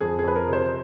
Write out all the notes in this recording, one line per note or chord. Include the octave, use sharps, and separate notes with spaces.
F2 G#4
G#4
F2 B4
A#4
C3
C5